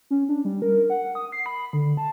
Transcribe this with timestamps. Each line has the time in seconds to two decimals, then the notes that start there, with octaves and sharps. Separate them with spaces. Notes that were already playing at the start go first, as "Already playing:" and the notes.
0.10 C#4
0.29 D4
0.45 G3
0.62 A#4
0.90 F#5
1.15 D#6
1.32 C7
1.46 B5
1.73 D3
1.97 A5